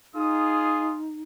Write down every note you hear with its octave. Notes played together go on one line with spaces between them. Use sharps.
D#4 F4 G#4 D#6